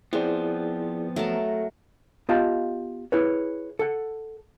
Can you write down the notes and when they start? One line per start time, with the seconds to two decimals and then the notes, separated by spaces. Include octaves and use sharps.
0.13 F3 B3 C4 E4 G#4 D5
1.16 F#3 A3 A#4 E5 A5
2.29 B3 F4 G4 D#5 F5 A5
3.12 E4 G#4 B4 C#5
3.79 A4 F#5